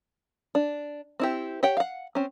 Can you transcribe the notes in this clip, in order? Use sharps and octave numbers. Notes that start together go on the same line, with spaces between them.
D4
C4 E4 G4
G4 C#5 F#5 G5
F5 F#5
C4 C#4